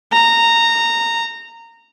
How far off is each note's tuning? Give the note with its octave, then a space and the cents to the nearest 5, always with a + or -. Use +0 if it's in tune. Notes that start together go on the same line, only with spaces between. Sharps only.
A#5 -15